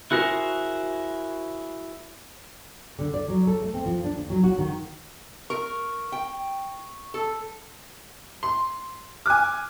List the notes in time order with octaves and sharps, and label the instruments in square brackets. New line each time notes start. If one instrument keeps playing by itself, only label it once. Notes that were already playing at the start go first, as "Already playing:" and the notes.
[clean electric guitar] E4 F#4 G#4 A#4 C5
[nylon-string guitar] D3
D5
F#3
A4
A3
C4
F3
D4
D#2
F#3
F#4
D#3
[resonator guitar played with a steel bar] A#4 [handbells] C#6
[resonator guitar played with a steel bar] G5
A4
[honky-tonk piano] C6
[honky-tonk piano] G#5 D6 [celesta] F6 F#6